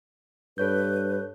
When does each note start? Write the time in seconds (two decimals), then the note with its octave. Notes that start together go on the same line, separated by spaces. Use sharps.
0.58 G2 A4 B4 C#5 G6